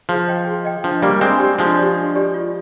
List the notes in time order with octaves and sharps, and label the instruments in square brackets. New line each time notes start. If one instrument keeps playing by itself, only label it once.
[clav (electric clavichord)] F3 [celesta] G#4
[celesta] D#5 G5
G#4
D#5 G5
[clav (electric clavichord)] F3 [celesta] D4
[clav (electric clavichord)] G3 A#3 [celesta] G4 D5
[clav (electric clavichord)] G#3 C4 [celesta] D4
[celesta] G4 D5
[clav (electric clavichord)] F3 G#3 [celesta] D4
[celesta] G4 D5
D4
G4 D5
F4